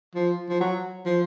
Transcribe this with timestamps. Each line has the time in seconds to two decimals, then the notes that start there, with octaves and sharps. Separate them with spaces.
0.15 F3
0.49 F3
0.60 F#3
1.06 F3